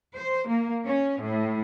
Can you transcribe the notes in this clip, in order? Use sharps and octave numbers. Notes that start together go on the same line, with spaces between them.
C5
A#3
C#4
A2